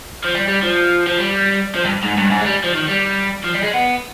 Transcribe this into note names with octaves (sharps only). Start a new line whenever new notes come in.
F3
G3
G3
F3
F3
G3
F3
G2
G#2
G2
G#2
G#3
G3
F3
D#3
G3
F3
G3
G#3
B3